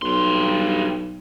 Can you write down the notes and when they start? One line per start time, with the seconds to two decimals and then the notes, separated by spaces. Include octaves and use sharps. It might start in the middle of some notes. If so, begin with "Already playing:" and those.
0.02 B1 G2 C6